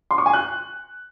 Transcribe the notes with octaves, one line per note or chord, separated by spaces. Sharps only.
C6
C#6
G#5
F#6